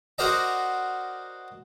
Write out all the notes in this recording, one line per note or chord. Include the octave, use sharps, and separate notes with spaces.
F#4 A#4 C5 D5 D#5 A#5